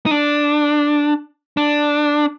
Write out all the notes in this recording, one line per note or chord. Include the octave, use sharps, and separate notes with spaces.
D#4
D4
D4